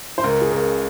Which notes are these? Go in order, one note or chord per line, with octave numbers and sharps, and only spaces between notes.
C5
C#2 A#4
G#4
C#3 A#4